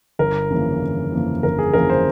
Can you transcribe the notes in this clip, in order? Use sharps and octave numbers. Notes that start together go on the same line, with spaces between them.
G1 A#4
F2 C#3 E3 A#3
G1
F2 C#3 E3 A#3
G1 A#4
G#4
F2 C#3 E3 A#3 A#4
C5